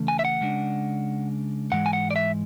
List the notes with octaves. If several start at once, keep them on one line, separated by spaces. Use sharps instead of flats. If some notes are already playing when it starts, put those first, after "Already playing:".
Already playing: C#3 E3 A3 C#4
G#5
E5
F#5
C#3 G#3 D4
G#2 E3 G#3 F#5
G#5
F#5
D5
E5